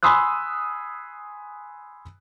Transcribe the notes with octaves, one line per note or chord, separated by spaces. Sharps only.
G#5 B5 C6 D#6 E6 F#6